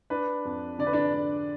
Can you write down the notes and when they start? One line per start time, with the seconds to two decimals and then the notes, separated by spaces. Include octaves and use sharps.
0.10 D4 B4
0.45 F2
0.79 D3 D5
0.86 B4
0.93 D4 D5
1.13 D4